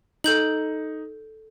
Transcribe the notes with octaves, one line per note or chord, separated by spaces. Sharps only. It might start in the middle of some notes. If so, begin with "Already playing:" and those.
D#4 A4 G6 F#7